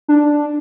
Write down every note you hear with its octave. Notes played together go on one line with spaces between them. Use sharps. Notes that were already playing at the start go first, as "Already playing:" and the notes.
D4